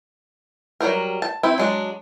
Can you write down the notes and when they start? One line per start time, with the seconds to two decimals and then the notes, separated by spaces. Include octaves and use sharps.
0.80 F#3 G3 A#3 A#4
1.22 A5
1.43 C4 E4
1.58 F#3 G#3 D4